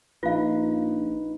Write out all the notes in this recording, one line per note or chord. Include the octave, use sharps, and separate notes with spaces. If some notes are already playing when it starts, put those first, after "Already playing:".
A#1 D#4 F4 B4 F5